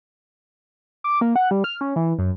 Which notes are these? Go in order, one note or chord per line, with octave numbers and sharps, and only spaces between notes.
D6
A#3
F#5
G3
F6
C#4
E3
F#2